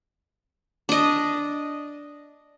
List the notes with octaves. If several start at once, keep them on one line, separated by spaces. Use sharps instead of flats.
D4 D#5